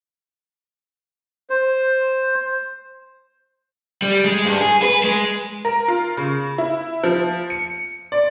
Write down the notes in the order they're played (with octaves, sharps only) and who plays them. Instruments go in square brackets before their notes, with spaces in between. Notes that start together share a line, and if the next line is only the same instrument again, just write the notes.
[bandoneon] C5
[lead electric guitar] G3
G#3
G2
G#4
B4
G#3
[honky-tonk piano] A#4
F4
C#3
E4
F3
C#7
D5